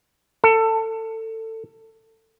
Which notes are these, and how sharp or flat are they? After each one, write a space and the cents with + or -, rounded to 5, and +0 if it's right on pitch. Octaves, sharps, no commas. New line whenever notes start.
A4 +25